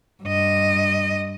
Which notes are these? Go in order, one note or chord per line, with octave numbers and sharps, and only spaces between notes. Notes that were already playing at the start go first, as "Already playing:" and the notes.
G2 D#5